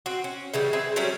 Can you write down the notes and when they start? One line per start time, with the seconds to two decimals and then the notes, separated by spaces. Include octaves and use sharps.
0.06 C4 F#4
0.24 C#4
0.54 C#3 E3 G3
0.73 C4 G#4 B4 E5
0.96 F#3 G3 A3 C#4